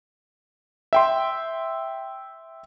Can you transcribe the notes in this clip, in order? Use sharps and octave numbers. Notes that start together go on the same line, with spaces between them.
E5 G5 C6